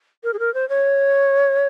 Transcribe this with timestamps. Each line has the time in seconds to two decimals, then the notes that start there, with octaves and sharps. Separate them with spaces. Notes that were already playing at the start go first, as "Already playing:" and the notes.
0.24 A#4
0.34 G#4
0.39 A#4
0.54 C5
0.69 C#5